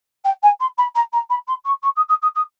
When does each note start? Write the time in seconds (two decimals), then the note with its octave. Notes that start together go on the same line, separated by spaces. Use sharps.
0.24 G5
0.42 G#5
0.60 C6
0.78 B5
0.95 A#5
1.12 A#5
1.30 B5
1.47 C6
1.65 C#6
1.83 C#6
1.96 D#6
2.09 D#6
2.22 D#6
2.35 D#6